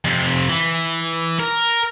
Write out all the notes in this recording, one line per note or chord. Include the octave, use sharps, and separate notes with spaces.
F2 C3
E3
A#4